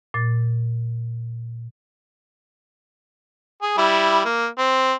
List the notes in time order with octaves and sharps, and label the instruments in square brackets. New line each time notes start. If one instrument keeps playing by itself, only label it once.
[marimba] A#2 A6
[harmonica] G#4
G3 E4
A#3
C4